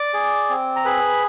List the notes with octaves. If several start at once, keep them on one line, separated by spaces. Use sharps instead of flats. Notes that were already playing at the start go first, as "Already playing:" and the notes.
Already playing: D5 D6
G#4
C4
A#5
G#4 B4 B5